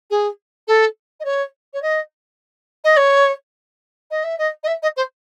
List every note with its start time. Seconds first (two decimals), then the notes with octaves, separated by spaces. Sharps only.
0.10 G#4
0.68 A4
1.20 D#5
1.25 C#5
1.73 C#5
1.82 D#5
2.84 D#5
2.97 C#5
4.11 D#5
4.24 E5
4.38 D#5
4.63 D#5
4.67 E5
4.83 D#5
4.97 C5